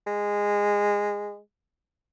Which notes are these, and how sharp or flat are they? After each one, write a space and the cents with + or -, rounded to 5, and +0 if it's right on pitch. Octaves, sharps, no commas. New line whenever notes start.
G#3 -15